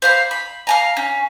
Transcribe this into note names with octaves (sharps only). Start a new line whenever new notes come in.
C5 F5 B5
B5
F5 A5 A#5
C#4